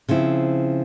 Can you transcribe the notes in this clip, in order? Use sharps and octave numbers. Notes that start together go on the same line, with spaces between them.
C#3 F3 C4 E4